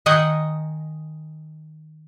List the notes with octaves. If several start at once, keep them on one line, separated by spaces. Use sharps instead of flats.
D#3 D#4 D#5 F#5 G#5